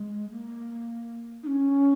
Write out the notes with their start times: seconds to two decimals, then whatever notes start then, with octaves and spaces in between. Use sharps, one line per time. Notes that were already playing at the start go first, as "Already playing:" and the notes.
Already playing: G#3
0.31 A#3
1.43 D#4
1.47 C#4